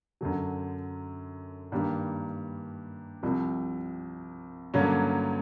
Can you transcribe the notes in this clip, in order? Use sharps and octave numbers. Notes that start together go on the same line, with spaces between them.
F#2 D3 F#3
G2 D#3 G3 A#3 D4
C2 C3 F3
G2 D3 F#3 A#3 C#4